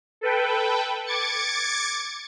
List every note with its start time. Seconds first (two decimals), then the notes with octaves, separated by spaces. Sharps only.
0.21 A4 B4 G5
1.06 D6 G#6 A6 C#7